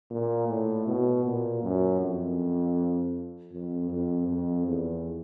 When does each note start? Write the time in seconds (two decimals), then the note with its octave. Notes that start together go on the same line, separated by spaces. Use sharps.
0.11 A#2
0.48 A2
0.87 B2
1.25 A#2
1.63 F#2
2.01 F2
3.52 F2
3.90 F2
4.28 F2
4.67 E2